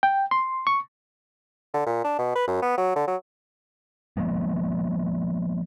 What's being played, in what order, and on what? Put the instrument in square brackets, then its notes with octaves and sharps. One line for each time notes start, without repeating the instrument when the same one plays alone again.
[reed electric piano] G5
C6
C#6
[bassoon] D3
A#2
D4
B2
B4
F#2
B3
F#3
D3
F#3
[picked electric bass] F3 G#3 A#3 B3